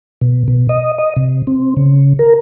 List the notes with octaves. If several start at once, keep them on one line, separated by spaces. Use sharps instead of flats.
B2
B2
D#5
D#5
C3
C4
C#3
A#4